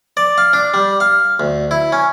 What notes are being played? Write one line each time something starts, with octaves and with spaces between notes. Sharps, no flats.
D5
F5
D4
G3
F5
D2
E4
C#4